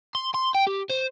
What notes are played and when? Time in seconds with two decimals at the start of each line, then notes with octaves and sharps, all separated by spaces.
0.15 C6
0.35 C6
0.55 G5
0.67 G4
0.90 C5